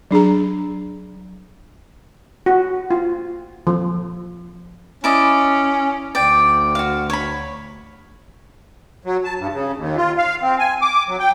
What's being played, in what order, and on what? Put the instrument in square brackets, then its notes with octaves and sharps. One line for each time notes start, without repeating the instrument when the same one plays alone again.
[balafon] F#3 D4 G#4 A#5
[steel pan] F#4
F4
F3
[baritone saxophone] C#4 [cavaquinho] E4 D5 D#5
[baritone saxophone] D2 [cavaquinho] D5 G5
[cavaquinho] F#4 F5
C#5 B5
[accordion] F#3
A5
G2
C#3
D#2
F4
F5
C4
G#5
D6
F#3
G5